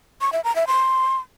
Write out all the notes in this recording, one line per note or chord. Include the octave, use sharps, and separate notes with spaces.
C#6
E5
A#5
E5
C6